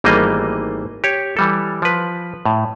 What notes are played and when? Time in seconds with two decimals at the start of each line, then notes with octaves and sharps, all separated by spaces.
0.04 G#1 E3 G3 A3 A#3 D#5
1.04 G4 C#5
1.37 E3 G3 A4
1.82 F3 B4
2.46 A2